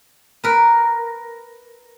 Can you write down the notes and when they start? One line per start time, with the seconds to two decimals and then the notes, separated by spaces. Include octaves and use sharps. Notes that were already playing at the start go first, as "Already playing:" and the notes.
0.44 A#4 B4